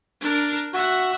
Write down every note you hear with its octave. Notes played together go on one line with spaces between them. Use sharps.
D4 A#4
F#4 E5 F#5